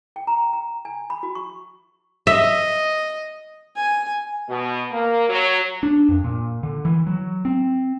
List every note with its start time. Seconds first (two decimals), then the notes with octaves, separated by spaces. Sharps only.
0.16 G5
0.27 A#5
0.53 A#5
0.85 G#5
1.10 B5
1.23 F#4
1.35 C#6
2.27 D#5 E5
3.76 G#5
4.50 B2
4.91 A#3
5.29 F#3
5.83 D4
6.09 F2
6.24 A#2
6.63 D3
6.85 E3
7.07 F#3
7.45 C4